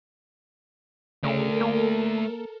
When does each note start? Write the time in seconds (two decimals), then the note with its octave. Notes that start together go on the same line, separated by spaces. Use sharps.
1.24 C#3 A3 A4 A#4 D5
1.61 A#3